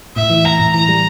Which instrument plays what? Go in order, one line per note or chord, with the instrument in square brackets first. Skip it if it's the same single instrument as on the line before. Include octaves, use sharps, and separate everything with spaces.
[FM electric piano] A2 [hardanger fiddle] E5
[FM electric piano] E3
[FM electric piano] A2 [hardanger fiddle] A#5
[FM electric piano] A2
[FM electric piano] E3 [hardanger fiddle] A#5
[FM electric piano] G3